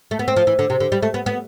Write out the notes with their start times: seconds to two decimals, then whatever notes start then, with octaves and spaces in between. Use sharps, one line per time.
0.11 A3
0.19 B3
0.28 C4
0.36 F3
0.47 E3
0.59 D3
0.70 C3
0.80 D3
0.92 G3
1.02 A3
1.14 B3
1.26 B3